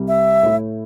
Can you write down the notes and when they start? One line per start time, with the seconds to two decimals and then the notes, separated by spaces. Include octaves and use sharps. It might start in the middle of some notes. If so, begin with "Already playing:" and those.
Already playing: C2 C3 G3
0.08 E5
0.43 A2 A3 E4